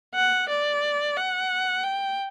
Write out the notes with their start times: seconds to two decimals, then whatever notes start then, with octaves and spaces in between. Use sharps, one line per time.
0.15 F#5
0.49 D5
1.17 F#5
1.84 G5